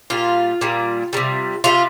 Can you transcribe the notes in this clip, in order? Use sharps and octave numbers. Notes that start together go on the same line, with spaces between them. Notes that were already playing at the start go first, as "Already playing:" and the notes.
A#2 G3 F4
A#2 G3
C3 D#3 G3
C3 D#3 G3 F4